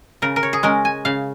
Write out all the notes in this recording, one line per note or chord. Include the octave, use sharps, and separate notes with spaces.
C#3 A#4
A#4
C#5
G#4
G#3 C#4 A#4
G#5
C#3 F5